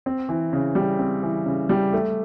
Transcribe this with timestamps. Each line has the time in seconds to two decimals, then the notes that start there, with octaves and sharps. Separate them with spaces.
0.06 C4
0.29 E3
0.53 C#3
0.75 G3
0.99 C4
1.23 E3
1.46 C#3
1.69 G3
1.93 A3